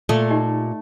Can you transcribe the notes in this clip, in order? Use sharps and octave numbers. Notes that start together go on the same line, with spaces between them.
A#2 A3
D#4 G4 D#5